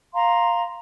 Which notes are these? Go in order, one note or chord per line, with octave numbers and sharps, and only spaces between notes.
F5 A#5 C6